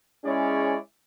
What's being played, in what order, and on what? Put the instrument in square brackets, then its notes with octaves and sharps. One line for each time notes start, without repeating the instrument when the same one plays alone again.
[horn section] G#3 C#4 E4 G#4 C#5 D5